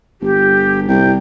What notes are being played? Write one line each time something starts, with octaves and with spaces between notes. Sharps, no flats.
G1 G4
C2 G5